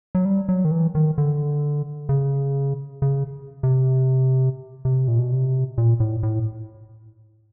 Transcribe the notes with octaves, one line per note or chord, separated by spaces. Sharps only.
F#3
G3
F#3
D#3
E3
D#3
D3
C#3
C#3
C3
C3
A#2
B2
C3
A#2
A2
A2